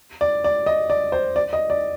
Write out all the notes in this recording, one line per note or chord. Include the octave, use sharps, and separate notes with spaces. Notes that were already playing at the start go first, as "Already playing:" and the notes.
D5
D5
D#5
D5
C5
D5
D#5
D5